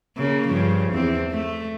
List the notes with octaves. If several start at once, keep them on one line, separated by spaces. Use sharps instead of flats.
C#3 A#3
G2 C#3 F3
E2 C4
A3